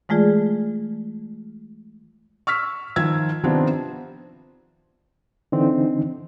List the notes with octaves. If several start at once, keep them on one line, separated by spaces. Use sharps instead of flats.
E3 G#3 A3 F4 G#4 D5
C#6 E6 F6 B6
D#3 F3 E6 G#6
C3 D#3 F3 B3 C4 D4
D3 E3 C4 D#4